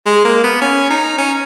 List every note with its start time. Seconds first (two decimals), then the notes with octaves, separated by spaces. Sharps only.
0.06 G#3
0.25 A#3
0.44 B3
0.61 C#4
0.90 D#4
1.18 C#4